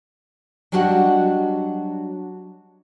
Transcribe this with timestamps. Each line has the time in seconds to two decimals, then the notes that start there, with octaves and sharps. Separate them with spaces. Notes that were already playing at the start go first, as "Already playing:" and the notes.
0.72 F#3 G3 D4 F#4 D#5 F#5